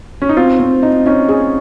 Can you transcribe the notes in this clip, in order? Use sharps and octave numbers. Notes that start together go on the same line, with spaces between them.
C#4
D#4
C4 F4
C4
D#4
C#4 D#4
G#4